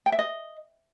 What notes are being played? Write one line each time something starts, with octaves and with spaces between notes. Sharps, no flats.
G5
E5
D#5